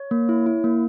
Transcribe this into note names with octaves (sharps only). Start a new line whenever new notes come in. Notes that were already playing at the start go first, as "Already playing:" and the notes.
Already playing: C#5
A#3
E4
E4
A#3